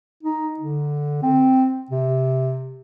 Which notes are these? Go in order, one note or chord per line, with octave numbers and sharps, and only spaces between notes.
D#4
D3
C4
C3